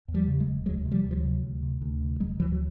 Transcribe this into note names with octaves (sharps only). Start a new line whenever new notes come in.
E2
F3 G3
C#3
F#3 G#3
E1
D2 F#3 G#3
C3
F3 G3
D2
F3
E3 F#3
C3
D2
C3
D2
C3
E1 F#3 G#3
D2 E3 F#3
F#3